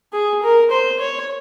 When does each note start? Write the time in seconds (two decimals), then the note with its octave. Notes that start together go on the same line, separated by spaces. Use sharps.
0.13 G#4
0.43 A#4
0.71 C5
1.00 C#5